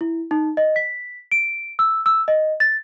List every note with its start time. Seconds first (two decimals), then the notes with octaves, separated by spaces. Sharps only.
0.01 E4
0.31 D#4
0.57 D#5
0.76 B6
1.32 D7
1.79 E6
2.06 E6
2.28 D#5
2.60 A6